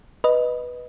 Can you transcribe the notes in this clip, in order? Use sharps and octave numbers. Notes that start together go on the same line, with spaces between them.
B4 D#5